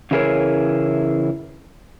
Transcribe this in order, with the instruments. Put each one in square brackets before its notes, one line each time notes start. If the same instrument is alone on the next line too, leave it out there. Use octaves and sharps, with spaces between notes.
[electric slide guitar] C#3 E3 E4 G#4 A#4 C#5